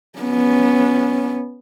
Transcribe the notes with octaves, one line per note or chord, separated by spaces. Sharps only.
B3 C#4